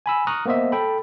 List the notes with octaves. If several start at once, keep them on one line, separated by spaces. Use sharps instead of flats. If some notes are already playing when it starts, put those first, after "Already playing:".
G#5 B5 E6
A#5 C#6 D#6 F6 F#6 A#6
A#3 B3 C5 D#5 E5
A4 G5 B5